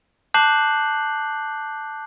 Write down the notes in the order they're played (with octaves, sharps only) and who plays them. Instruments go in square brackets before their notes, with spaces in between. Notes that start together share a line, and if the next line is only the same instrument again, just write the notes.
[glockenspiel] A5 D6 F#6 G6 C7 F#7